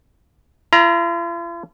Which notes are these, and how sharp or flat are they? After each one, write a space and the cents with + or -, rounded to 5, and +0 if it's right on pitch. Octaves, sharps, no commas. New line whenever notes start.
F4 -45 A#5 +20